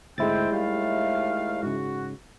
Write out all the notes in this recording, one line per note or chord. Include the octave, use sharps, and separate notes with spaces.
D2 G#2 G#3 A3 C4 E4 G5 A6
D#2 G3 A3 F5
G#2 C#3 F#4